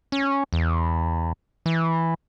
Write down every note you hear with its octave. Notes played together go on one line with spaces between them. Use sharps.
C#4
E2
E3